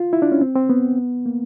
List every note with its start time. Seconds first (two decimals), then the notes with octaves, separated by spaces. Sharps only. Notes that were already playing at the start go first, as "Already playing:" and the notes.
Already playing: F4
0.13 E4
0.22 D4
0.32 C#4
0.41 C4
0.55 C4
0.70 B3
1.26 A#3